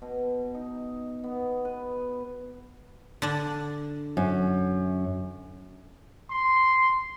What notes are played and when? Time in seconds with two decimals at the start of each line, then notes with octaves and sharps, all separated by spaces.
0.02 B2
0.55 D#4
1.24 B3
1.65 B4
3.22 D3 D4
4.17 F#2
6.31 C6